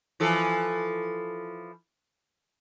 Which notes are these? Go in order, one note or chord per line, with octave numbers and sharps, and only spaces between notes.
E3 F3 A4